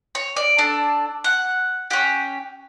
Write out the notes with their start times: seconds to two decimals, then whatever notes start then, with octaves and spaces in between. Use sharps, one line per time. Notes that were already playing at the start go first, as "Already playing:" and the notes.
0.15 C#5
0.36 D5
0.58 D4 A4
1.24 F#5
1.90 C#4 G4 F#5